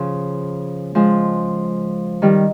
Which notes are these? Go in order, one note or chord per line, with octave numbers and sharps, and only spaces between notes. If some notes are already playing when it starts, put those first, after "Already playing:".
Already playing: C#3 F3
F3 G#3
D#3 G3